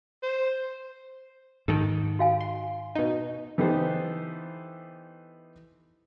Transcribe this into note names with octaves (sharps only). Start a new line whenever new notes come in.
C5
G#2 D#3 A4
F#4 F5 G#5
C6
B2 D#4
E3 B3 D#4 G4 A4 C5